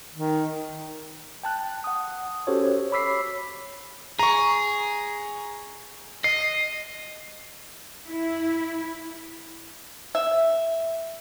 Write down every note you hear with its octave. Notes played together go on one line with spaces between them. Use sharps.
D#3
G5 A5 F#6
F#5 D#6
C#4 F#4 G4 A4 C5 C#5
C#5 B5 D6 E6 B6 C7
G#4 A#5 C#6
D#5 C7
E4
E5